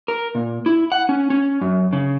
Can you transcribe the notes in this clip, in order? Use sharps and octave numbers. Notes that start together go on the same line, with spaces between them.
A#4
A#2
E4
F#5
C#4
C#4
F#2
C#3